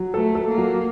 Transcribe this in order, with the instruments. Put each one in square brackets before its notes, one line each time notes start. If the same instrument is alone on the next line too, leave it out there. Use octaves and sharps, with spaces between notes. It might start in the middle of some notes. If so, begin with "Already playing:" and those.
Already playing: [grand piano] F#3
[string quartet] A3 [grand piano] A4
[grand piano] A4
[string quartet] A#3
[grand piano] F#3